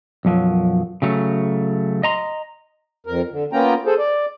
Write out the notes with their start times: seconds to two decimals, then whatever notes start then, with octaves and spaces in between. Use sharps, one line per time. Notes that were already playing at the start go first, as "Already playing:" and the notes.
0.25 B1 F#2 F3 F#3
1.02 C#3 F#3 A3
2.03 D#5 A#5 C6
3.07 F2 A#4
3.31 D3
3.53 A#3 B3 C#4 F4 G5 A#5
3.86 G#4 A4 C5
3.99 D5